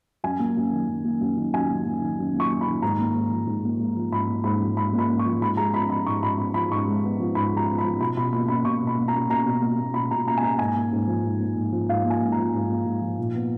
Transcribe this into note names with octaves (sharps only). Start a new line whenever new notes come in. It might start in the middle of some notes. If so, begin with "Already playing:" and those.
F#2 G#5
A#3
F#2
D#3
F#2
A#3
F#2
D#3
F#2 G#5
A#3
F#2
D#3
F#2
A#3
C#6
F#2
B5
D#3
G#2 A#5
A#3
G#2
F3
G#2
A#3
G#2
F3
G#2 B5
A#3
G#2 B5
F3
G#2 B5
A#3
B5
G#2
C#6
F3
G#2 B5
G#3 A#5
B3 B5
F3 B5
G#2 C#6
G#3 B5
B3 B5
F3 B5
G#2 C#6
G#3
B3
F3
G#2 B5
G#3 A#5
B3
B5
F3
B2 B5
B2 B5
A#3 B5
A#3 B5
B2 C#6
B2
B5
A#3
A#5
A#3
B2 A#5
B2
A#3
A#3
B2 B5
B2 A#5
A#3 A#5
G#5
A#3 A#5
G#2 G#5
A#3
G#2
F3
G#2
A#3
G#2
F3
G#2 F5
A#3
G#5
G#2
A#5
F3
G#2
A#3
G#2
F3
A#2
B3